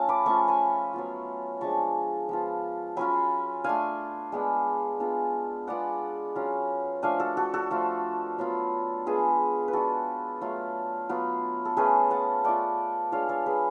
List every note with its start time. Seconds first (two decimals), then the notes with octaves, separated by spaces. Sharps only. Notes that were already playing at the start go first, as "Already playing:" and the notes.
Already playing: A3 C#4 F4 A4 A5
0.09 B5 D6
0.26 F3 A3 C#4 F4 A5 C#6
0.48 G#5 B5
0.93 F#3 B3 F4
1.61 F3 G#3 D4 A5 C#6
2.29 F3 B3 F4
2.96 F#3 C#4 F4 G#5 B5
3.64 A3 D4 F4 F5 G#5
4.32 G#3 B3 D4
5.00 G#3 B3 D4 F4
5.67 G#3 B3 F4 D5 F#5
6.36 F#3 C#4 F4
7.02 F3 A3 D4 F5 G#5
7.20 F#4 A4
7.37 F#4 A4
7.54 F#4 A4
7.71 F3 A3 F4
8.38 F#3 B3 F4
9.06 G#3 B3 D4 F4 G#4 B4
9.68 B4
9.73 G#3 D4 F4 F#4 A4
10.41 F#3 A3 F4
11.09 F#3 B3 F4
11.65 A4
11.77 A3 C#4 F4 G#4 B4
12.11 F#5 A5
12.44 A3 F4 D5 F#5
13.12 G#3 D4 F4 C#5 F5
13.29 A4 C#5
13.46 G#4 B4